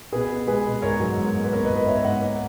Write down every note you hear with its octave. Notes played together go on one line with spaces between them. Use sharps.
B2 G#4 B4
B3
G#3 G#4 B4
B2
G#2 A#4 C#5
F#3
G#2
A#3
B4
B3 A#4 C#5
B4 D#5
G#2
B4 D#5
B3 C#5 E5
G#2 D#5 F#5
A#3